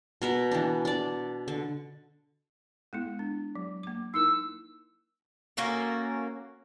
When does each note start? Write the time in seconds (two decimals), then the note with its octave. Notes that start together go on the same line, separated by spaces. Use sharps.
0.22 B2 A#4 B4
0.51 E3 D4
0.85 D4 D5
1.48 D3
2.93 G#3 B3 E4
3.19 D4
3.55 F#3
3.83 A#3 D6
4.14 D#4 E4 A#4 E6
5.57 A#3 C#4 F#4 A4